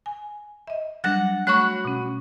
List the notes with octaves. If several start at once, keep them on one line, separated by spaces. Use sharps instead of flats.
G#5
D#5 E5
F#3 G3 D4 F#5
A3 F#4 C#5 F#5 B5 F#6
B2 C#4